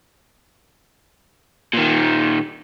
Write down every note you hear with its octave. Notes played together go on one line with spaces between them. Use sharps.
A#2 D#3